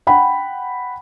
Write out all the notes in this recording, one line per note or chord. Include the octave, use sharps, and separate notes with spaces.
F#5 G5 B5